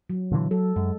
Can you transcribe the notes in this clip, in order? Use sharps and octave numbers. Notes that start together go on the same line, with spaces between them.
F#3
A#2 D3 E3
F#3 A4
F#2 G#3